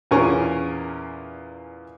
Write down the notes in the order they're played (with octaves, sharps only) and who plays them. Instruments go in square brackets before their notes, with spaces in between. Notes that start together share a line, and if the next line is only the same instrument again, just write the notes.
[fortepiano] E2 A#2 C#4 A#4 G#5 C#6